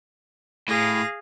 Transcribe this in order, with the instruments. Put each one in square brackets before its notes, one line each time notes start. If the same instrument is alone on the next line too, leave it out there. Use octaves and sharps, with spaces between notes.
[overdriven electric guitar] A2 [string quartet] G#4 F5 A#6